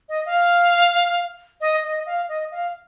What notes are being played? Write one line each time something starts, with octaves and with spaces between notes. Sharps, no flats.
D#5
F5
D#5
D#5
F5
D#5
F5